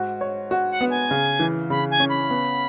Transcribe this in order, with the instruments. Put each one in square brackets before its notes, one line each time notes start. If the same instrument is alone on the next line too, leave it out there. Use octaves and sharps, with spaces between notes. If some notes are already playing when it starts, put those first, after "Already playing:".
Already playing: [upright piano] G#2 F#4
C#5
F#4
[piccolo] F#5
[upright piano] B3
[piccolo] G#5
[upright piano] C#3
E3
[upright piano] C#3 [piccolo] B5
[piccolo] G#5
[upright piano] C#4
[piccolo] B5
[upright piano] B3